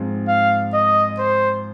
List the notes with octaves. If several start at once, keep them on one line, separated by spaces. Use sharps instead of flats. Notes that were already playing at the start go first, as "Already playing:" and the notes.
Already playing: G#2 F3 C4
F5
D#5
C5